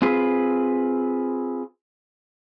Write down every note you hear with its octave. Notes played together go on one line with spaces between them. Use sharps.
C4 F4 G#4 B4